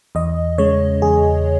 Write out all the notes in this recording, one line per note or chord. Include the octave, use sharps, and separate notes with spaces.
E2 D#5
C#3 G#3 C#5
E2 G#4